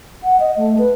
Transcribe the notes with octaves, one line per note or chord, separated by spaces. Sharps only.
F#5
D#5
A3
B4